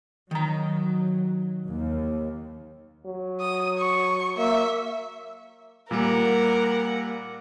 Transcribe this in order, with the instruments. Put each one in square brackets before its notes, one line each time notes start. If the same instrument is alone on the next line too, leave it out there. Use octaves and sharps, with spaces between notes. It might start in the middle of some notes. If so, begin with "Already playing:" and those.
[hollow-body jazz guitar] D#3 A#5 [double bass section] F#3
[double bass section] D#2
[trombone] F#3
[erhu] D#6
C#6
[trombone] A#3 [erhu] E5
[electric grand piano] A#2 G3 A#3 [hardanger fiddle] A#4 F#5